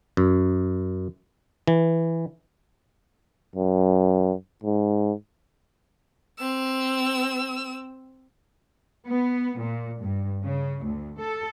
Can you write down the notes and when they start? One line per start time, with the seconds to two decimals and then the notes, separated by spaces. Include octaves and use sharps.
0.17 F#2
1.68 E3
3.56 F#2
4.64 G#2
6.38 C4 E6
9.07 B3
9.59 A#2
10.01 G2
10.42 C#3
10.84 D2
11.19 A4